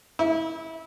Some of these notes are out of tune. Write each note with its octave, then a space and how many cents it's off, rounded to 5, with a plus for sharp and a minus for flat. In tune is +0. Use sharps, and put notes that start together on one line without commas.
E4 -25